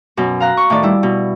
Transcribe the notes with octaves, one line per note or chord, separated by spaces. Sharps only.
F#2 B2
F5 A#5 F#6
C#6
A2 D#3 D5
G3 E4
B2